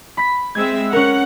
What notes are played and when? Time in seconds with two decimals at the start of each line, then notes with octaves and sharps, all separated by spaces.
0.17 B5 B6
0.55 G#3 C4 E5 G#6
0.93 C#4 A#4 F#5